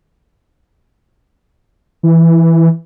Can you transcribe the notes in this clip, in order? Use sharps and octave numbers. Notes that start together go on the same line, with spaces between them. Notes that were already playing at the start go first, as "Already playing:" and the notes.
E3